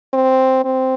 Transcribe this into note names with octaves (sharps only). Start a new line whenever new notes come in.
C4
C4